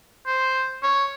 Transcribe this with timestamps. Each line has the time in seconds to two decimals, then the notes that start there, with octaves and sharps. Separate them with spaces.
0.27 C5
0.83 C#5